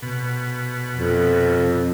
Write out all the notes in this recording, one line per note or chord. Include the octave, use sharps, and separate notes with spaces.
B2
F2